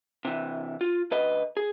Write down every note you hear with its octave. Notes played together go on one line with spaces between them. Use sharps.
C3 E3
F4
D2 B4 D#5
G#4